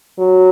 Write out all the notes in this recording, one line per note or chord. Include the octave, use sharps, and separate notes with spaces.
F#3